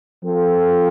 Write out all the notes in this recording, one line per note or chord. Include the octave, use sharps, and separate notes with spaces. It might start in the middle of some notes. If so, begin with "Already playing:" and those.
F3 C4 F4 A4